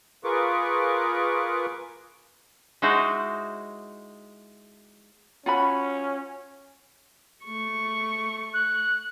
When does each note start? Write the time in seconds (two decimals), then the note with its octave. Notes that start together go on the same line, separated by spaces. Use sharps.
0.24 F4 G#4 A#4 B4 C#6 D6
2.82 G#3 D#4 E4 F#4 C5
5.46 C#4 F4 F#4 B5
7.44 A3 C#6
8.54 F#6